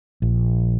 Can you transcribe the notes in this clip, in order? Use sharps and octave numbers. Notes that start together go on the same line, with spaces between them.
A#1